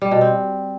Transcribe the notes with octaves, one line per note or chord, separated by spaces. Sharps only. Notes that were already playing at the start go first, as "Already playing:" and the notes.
G3
B2
C4